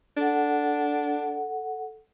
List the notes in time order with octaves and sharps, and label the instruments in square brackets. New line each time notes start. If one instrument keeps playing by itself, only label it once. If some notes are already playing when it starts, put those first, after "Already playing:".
[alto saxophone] D4 [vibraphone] A4 F#5